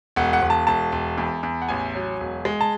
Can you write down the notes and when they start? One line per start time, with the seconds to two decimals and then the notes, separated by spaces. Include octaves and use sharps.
0.16 E1 F#5
0.33 F#5
0.42 E1
0.50 A5
0.67 E1 A5
0.92 E1
1.18 E2
1.43 E2
1.62 F#5
1.69 A1 G#5
1.95 F#3
2.20 E1
2.45 G#3
2.61 A5